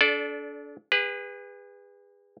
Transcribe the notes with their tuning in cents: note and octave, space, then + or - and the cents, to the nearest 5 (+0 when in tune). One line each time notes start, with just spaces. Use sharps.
D4 -25 A4 -30 D5 +0
G#4 -40 B4 +0